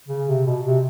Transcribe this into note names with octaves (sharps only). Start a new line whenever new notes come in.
C#3
C3
B2
C3